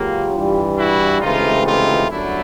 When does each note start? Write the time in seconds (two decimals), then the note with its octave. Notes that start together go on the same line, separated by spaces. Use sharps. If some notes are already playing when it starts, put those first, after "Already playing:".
Already playing: C#2 C#3 F#3 A#3 F4 G4
0.33 G2 E3 G3
0.77 E4 F#4
1.21 C#2 C3 E3 A3 C4 D#4 F4
1.65 D#4 F4
2.09 G1 F#2 D3 F#3 A3 D4 E4